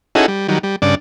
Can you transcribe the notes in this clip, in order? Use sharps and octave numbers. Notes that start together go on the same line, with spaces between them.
C#4 D#4 E4 F#4 G#4 A4
G3
D#3 F#3 G3
G3
G2 C#3 D4 D5